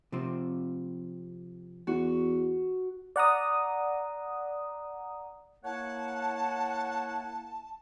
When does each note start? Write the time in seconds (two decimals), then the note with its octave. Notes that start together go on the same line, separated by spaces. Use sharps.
0.12 C3 F3 C4
1.87 E2 F#4
3.16 D5 F#5 A#5 D#6
5.65 A#3 E4 C#5 F#5 A5